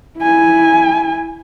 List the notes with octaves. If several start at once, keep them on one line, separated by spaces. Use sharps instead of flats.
E4 G#5